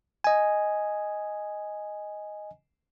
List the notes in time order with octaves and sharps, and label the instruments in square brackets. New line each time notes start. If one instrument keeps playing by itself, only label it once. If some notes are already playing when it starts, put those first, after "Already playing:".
[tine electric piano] D#5 G#5